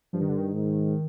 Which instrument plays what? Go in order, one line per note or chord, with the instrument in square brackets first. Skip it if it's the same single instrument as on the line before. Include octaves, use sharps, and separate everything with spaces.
[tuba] G2 [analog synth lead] F3
[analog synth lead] D#3
D3
D#3
[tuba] G#2